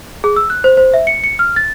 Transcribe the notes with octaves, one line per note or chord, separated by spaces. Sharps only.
G#4
E6
F#6
C5
C5
E5
C#7
C#7
F6
A6